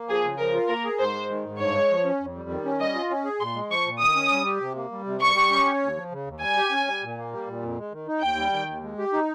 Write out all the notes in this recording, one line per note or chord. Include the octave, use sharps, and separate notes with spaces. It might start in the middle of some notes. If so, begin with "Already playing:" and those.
Already playing: A#3
F3 G#4
C#3
F3 A#4
F4
A#3 A#4
G#4
G#2 C5
G#3
D#3
G#2
G2 C#5
G#3
F3
C#4
F2
G3
D#3
C#4
G3 D#5
F4
C#4
G#4
A#2 C6
G#3
F3 C#6
A#2
D#3 D#6
C#4
G3
G4
C3
A#3
G3
C3
G3 C#6
G4
C#4
C#5
D#2
F3
C#3
D#2
G3 G#5
G4
C#4
G3
A#2
A#3
G3
A#2
F2
G#3
D#3
D#4
D#2 G5
G3
D#3
D#2
G#3
G4
D#4